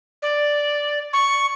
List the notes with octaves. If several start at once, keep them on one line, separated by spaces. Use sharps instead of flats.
D5
C#6